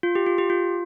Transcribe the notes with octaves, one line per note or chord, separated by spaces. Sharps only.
F4
G4
F4
G4
F4